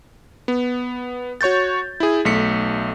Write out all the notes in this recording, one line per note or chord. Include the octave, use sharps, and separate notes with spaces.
B3
F#4 C#5 C#6 G6 A6
E4 G#4
B1 A3 B6 C#7